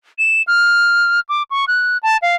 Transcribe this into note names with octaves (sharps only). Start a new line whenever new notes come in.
E7
F6
D6
C#6
F#6
A5
F5